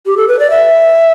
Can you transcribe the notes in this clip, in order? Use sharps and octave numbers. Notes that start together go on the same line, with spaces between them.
G4
A4
B4
D5
E5